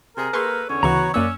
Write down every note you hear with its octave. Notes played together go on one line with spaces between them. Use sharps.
C3 G#4 A#4
A#3 G#4 A4 B4 C6 C#6
E2 D3 C#4 C#5
D2 C#3 E3 B3 F#4 A#5 C#6
F#2 A#3 C#4 D5 E6 F#6